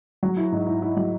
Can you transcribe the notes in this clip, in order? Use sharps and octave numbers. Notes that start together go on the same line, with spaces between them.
F#3
E4
G#2
E4
E4
F#3